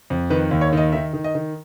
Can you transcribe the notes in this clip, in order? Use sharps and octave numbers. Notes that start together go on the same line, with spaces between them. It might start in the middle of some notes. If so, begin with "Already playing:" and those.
F2
D#3 B4
D#2
C#5
D#3 D#5
D#3 E5
D#3
D#5
D#3